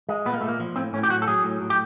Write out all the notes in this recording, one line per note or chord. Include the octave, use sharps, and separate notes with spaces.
G#3
A#2 B3
A#3
A#2 A3
A#3
F3
A2 C4
A2 C#4
G4
F#3 F#4
A4
F#3 G#4
A2
A2
G4